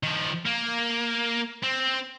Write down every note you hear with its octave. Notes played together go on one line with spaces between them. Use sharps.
D#3 F3
A#3
C4